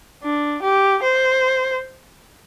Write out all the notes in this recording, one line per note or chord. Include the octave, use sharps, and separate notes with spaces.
D4
G4
C5